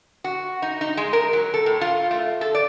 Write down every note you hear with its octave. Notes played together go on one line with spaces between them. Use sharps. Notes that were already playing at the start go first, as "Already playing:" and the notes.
F#4
D#4
D#4
G#3
A#4
F#3
A4
A2
F4
A3
A4
D5